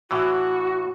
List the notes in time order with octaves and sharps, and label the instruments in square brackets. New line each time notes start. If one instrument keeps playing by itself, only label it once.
[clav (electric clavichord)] A2 E3 [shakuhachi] F#4